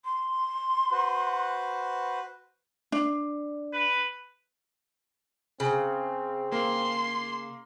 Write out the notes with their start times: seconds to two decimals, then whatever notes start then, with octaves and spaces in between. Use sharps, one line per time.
0.05 C6
0.91 F#4 B4 C5
2.92 D4
3.73 B4
5.60 C#3 C4
6.52 A#3 C6